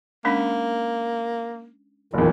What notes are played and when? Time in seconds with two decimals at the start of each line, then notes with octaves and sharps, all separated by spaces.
0.25 G#3 A#3 C#4 D4
2.14 F#1 E2 A#2 D#3